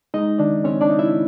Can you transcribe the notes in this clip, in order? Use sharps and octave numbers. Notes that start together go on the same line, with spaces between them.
G#3 D#4 D#5
D#3 D4 D5
C4 C#4 C#5
D4 D5
D#4
E4 E5